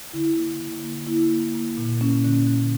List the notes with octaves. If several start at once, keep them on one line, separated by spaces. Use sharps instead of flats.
D3 E4
A#3
D3
A#3
A#3 E4
A#3
A#3
A#2
A#3 C#4
D3
D3